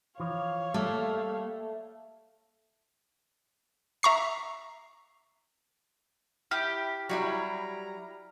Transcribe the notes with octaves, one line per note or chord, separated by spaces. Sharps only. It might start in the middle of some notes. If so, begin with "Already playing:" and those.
E3 F3 C#5 F5
G3 A3 A#3 A4
E5 A#5 C#6 C7
E4 G4 F6
F#3 G3 E4 A#5